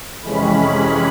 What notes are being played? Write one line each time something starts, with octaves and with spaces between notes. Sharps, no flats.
F2 C3 E3 G#3 C#4 B5
B5